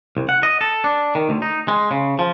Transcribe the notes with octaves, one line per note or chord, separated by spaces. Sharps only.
C2
F#5
D#5
A4
D4
D#3
D2
D#4
G#3
C#3
F3